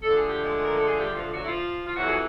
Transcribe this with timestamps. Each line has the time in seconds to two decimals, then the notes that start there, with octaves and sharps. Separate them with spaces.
0.03 D3 F3 A3 D4 A4
0.17 G#4
0.29 G4
0.43 G#3 G#4
0.65 A#4
0.77 A4
0.88 G#4
0.99 G3 G4
1.15 F3 F4
1.32 F#3 F#4
1.44 E4
1.48 F3 F4
1.86 F4
1.96 F2 C3 E3 F#3 F#4
2.07 G#4